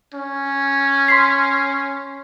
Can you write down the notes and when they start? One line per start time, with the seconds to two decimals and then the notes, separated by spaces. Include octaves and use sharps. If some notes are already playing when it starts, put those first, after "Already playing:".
0.14 C#4
1.08 C6 B6 C7